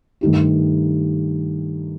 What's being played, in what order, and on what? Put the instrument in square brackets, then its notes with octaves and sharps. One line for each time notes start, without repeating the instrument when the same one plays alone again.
[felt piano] G2 D#3 A3 D#4 G4